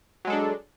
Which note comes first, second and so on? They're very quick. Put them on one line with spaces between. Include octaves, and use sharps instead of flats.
F#3 G#3 A4 D4